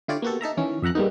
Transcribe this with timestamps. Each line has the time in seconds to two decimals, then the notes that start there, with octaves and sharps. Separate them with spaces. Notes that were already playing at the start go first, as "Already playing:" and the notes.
0.08 D3 E4 F4 G4 C#5 D5
0.22 A#3 B3 F#4 G4 A4
0.41 D#4 A4 E5 A#5
0.57 D#3 E3 C#4
0.82 F2 E5 F#5 A#5 F#6
0.95 G3 G#3 A#3 B3 D#4